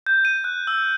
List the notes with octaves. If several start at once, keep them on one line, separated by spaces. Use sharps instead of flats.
G6
D#7
F#6
E6